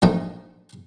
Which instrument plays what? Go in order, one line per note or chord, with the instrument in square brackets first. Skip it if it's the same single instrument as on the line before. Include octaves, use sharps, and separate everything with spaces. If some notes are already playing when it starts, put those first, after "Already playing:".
[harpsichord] A#1 A#2 F3 A3 D#4 G5